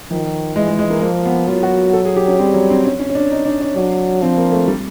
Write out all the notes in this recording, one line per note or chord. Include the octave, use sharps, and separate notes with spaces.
D#3 F3
E3 G#3
G#3
G#3
A#3
F3 A#3
B3
F#3 F4
F#4
A4
G#4
G4
C#4
G3 C4
F#3
C4
C#4
C#4
C#4
D4
D#4
D4
C#4
F#3 D4
F3 C4
A#3
A3
G3